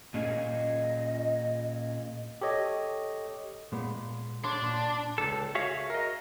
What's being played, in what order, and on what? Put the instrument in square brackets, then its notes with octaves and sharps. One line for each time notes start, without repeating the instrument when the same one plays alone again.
[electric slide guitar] A#2 C#4 G#4 [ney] D#5
[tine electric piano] G4 A4 C#5 D#5
[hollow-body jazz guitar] A#2 G#3 B3
[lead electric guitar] D4 [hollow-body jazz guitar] C#5 C6
[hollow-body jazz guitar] A#2 C6
[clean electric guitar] C#2 F#2 A4
F#4 G#4 C#5 E5 F5
A#4 D#5